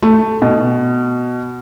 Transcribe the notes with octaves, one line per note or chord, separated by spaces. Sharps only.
A3
B2